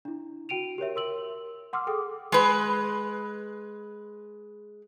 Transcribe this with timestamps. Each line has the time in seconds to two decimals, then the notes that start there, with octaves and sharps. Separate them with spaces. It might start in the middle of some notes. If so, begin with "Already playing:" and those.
0.05 D4 E4
0.49 F#4 G5 D7 D#7 F7
0.78 G4 A#4 C#5 E5
0.95 A#4 C6 E6 F#7
1.73 F#5 C6 D6 E6 F6
1.87 G#4 A4 G5 D6 D#6
2.32 G#3 B4